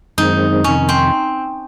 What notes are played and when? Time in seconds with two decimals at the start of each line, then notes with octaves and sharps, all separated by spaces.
0.18 F#2 D#3 G#3 C4 D#4
0.64 F2 C3 D#3 C#4
0.89 C4